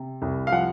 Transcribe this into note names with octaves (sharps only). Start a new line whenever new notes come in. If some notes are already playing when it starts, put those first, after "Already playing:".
Already playing: C3
C2
F5
F3 F#5